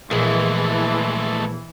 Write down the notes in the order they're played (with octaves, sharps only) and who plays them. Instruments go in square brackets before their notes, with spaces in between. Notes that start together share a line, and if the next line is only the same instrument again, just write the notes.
[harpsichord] A#1 [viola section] E3 [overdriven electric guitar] G#3 A3